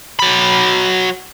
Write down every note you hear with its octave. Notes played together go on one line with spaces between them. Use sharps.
F#3 B5